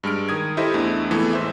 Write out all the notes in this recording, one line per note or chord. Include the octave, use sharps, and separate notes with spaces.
G2 G#3 F6 D7
D#3 D#6 G#6
E4 G4 A4 C5 D#5 E5
E2 A3 D4 E4
F2 E3 G#3 A3 B3 E4
A1 C5 E5